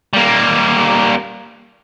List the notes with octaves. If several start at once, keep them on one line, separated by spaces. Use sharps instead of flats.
G3 A#3